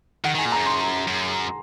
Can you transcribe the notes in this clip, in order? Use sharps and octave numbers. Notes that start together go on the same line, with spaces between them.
D#3 F#5
D#3 G#5
A#2
A#5
F#2
C6
F#2